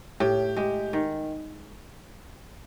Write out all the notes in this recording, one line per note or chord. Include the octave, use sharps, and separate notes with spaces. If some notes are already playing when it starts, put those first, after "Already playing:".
A2 G4
G#3 G4
D#3